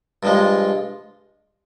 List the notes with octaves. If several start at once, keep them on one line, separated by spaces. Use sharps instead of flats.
G2 F3 G#3